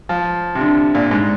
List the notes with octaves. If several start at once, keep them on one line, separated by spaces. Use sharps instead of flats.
F3
C3
D3
A#2
G#2